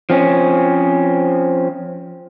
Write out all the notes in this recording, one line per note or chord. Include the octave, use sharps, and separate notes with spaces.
F3 C4 C#4